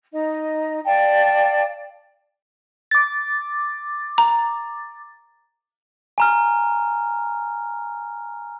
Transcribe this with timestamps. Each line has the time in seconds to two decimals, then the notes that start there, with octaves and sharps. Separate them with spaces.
0.13 D#4 D#5
0.85 D5 F5 G5 A5
2.91 D6 A6
4.18 A#5
6.18 G#5 A#5 F6